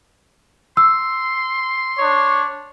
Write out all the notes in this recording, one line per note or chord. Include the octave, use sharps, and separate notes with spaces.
C6 E6
D4 C#5